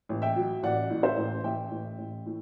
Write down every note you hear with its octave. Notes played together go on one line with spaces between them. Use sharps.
A1
E5 G5
F#3
A1 D5 F#5
A2
C5 E5
A1
A1 E5 G5
A1
A1
A2